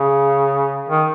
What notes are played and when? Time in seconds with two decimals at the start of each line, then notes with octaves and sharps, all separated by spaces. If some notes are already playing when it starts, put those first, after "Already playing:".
Already playing: C#3
0.89 D#3